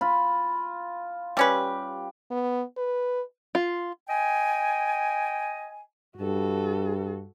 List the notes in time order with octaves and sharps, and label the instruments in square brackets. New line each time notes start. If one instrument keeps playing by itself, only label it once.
[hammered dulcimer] F4 B5
[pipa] G3 C#4 B4 [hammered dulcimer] G4
[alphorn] B3
B4
[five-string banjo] F4
[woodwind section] D#5 G5 G#5
[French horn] G2 [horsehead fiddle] F#4 A4